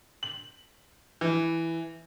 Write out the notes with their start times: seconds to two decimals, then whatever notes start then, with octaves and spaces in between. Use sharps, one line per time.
0.23 F#7
1.21 E3